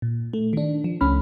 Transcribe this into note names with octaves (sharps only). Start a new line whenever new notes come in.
A#2
A3
D#3 D4
F3
C#2 A3 C#4 B5 F6